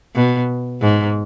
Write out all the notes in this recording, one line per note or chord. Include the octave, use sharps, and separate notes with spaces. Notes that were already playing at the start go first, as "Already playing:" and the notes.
B2
G#2